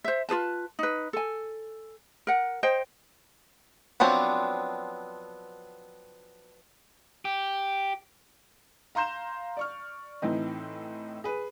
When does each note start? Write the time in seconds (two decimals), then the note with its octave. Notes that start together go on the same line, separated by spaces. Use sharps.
0.04 C5 E5
0.29 F4 G#4 B4 A5
0.79 D#4 B4
1.13 A4 G#5
2.27 A#4 F#5
2.63 C5 D#5 G5
4.00 F3 F#3 B3 C4 D4
7.25 G4
8.95 F5 A#5 C6 G6 E7
9.57 D5 C#6 F6
10.22 A2 E3 C4 D#4
11.24 G#4 B4